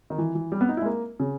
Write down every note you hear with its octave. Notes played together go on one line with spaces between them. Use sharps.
D#3
E3
E3
G3
B3
D#4
E4
G#3
A#3
C#3